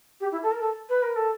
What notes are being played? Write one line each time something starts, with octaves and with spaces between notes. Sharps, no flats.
G4
E4
A4
A#4
A4
B4
A#4
A4